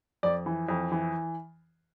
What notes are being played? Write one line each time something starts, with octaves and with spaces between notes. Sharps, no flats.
F2 D5
E3
F2
E3